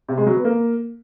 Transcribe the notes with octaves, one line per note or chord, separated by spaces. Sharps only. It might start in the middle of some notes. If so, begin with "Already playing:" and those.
C3
G#3
F#3
B3
A#3